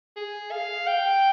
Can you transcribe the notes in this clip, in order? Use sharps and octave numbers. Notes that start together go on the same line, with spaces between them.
G#4
F5
G5